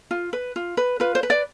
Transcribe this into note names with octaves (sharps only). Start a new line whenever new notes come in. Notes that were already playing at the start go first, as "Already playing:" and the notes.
F4
B4
F4
B4
F4 B4
C5
B4
D5